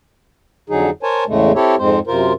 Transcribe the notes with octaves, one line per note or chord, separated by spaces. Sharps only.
F2 D3 F#3 D#4 G#4
A#4 C5 C#5 G#5 A5
E2 A2 C#3 G#3 A3
C4 E4 G4 A4 C#5
F2 G#2 G#3 C4 C5
F#2 C3 F4 A#4 C5